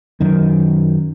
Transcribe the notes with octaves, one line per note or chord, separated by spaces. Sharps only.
F#2 D#3